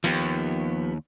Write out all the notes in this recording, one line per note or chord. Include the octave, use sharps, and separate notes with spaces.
D#2 F3 B3 G4